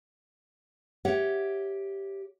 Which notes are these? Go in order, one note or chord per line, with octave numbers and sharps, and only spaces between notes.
G4 C#5 E5 F#5